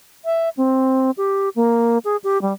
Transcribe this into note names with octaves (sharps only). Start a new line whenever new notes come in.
E5
C4
G4
A#3
G#4
G4
G3